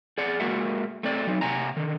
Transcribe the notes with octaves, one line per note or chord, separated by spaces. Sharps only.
G#4 D5 F#5
G#3 A#3 F#4 A#4 E5 F#5
A3 C4 D5
F#3 D#4
C3 F#5 G#5 A#5
D3 D#3